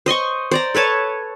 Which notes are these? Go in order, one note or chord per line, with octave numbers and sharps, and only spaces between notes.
C5 D#5 C6 C#6
C5 D5 A#5
A4 B4 C#5 A5